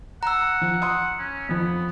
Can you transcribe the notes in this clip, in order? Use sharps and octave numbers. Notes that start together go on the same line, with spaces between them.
F#5 A#5 E6
F3
C6 D#6
C#4
F2 F3 B3